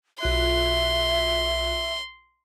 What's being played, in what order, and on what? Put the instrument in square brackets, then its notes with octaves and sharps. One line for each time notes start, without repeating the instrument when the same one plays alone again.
[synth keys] B1 F4 F#6 [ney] E5 [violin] C6